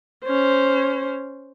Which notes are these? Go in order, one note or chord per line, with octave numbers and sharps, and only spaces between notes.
C#4 C5